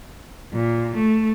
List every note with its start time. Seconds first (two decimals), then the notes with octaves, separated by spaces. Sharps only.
0.53 A#2
0.96 A3